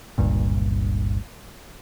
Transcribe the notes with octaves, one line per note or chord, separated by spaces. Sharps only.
G1 C#2 G2 A#2